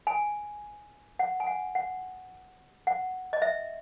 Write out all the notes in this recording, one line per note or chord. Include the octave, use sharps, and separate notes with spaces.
G#5
F#5
G#5
F#5
F#5
F#5
D#5
E5